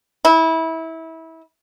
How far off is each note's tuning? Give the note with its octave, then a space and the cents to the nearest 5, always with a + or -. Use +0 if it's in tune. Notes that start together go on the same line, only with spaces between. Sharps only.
E4 -25